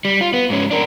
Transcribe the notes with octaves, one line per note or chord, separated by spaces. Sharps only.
G3
F4
B3
G#2 C#4
D4 A#4